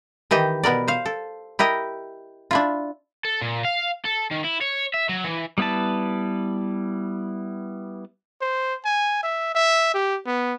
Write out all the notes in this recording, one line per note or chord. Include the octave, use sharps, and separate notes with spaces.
D#3 E3 G4 D#5
B2 B3 A#4 D5
C5 F5
A4
E4 G4 A#4 D#5
D4 E4 F4
A4
A#2
F5
A4
D#3
E4
C#5
E5
F#3
E3
G3 B3 E4 B4 A5
C5
G#5
E5
E5
G4
B3